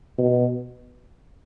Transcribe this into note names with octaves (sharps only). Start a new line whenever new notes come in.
B2